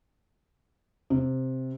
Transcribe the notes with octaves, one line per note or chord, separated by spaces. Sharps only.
C3